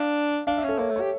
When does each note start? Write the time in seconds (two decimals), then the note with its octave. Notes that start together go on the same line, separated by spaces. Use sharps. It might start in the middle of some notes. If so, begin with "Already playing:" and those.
Already playing: D4 F5
0.47 D4 F5
0.58 E5
0.64 C#4 A4
0.79 A#3 C#5
0.90 A3
0.96 G4 C#5